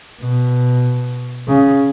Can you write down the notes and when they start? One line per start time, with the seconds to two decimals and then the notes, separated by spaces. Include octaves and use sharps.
0.21 B2
1.48 C#3